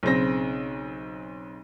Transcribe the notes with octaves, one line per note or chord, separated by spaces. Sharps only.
B1 C#3 C4 A#6